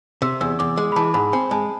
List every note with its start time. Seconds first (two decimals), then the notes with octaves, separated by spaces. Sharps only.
0.22 C3 E6
0.41 E2 E6
0.59 E2 D6
0.77 G#3
0.92 B5
0.96 E3 A5
1.14 G#2 B5
1.33 C4 G#5
1.51 G#3 A5